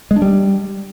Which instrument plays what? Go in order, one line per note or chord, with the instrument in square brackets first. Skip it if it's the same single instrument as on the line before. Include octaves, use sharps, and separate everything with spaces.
[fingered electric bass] G#3
D4
G3